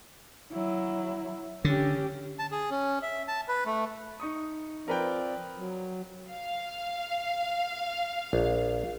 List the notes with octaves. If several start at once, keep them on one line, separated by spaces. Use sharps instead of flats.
F#3 E4
D3 C#4 G4
A5
G#4
C#4
E5
A5
B4
A3
D#4 C#6 D#6
F3 C4 A#4 B4 D5 G5
F#3
F5
A#1